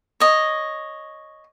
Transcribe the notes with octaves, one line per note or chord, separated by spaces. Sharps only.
C#5 D#5